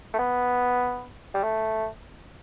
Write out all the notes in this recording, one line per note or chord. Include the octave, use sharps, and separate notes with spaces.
A3
B3
G3
A3